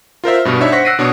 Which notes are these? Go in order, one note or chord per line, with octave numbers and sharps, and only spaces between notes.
F4 A#4 C5 E5
G2 B2
D4 D#4 C#5 E5
C5 F#5 C#6 A#6 B6
E6 F#6 A#6 C7 D7 D#7
B2 D4 F#4 C#5 C#6 D#6